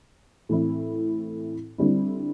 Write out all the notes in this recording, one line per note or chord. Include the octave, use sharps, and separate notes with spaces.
A2 E3 C4 E4
D3 G3 C4 E4